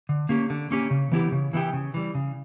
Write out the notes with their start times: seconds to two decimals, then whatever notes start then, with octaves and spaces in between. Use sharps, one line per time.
0.09 D3
0.29 A#3 C#4 G4
0.50 D3
0.71 A#3 C#4 G4
0.91 C#3
1.12 E3 B3 E4 G4
1.32 C#3
1.53 E3 B3 E4 G4
1.73 C#3
1.94 E3 G3
2.15 C#3